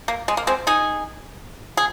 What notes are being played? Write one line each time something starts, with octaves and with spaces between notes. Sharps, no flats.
A#3
G#3
A#3
G#3 C4
D#4 G#4
G#4